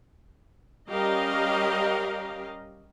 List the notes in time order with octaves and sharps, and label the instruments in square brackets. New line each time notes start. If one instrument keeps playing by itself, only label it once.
[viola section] G3 C#4 G4 A#4 D#5 F5